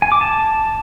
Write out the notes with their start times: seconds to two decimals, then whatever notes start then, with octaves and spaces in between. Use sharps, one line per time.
0.02 G#5
0.12 D6
0.21 A5